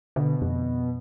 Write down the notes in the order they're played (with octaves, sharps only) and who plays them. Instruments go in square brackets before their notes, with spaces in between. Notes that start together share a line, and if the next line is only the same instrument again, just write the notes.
[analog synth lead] B2 [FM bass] D3
[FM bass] F2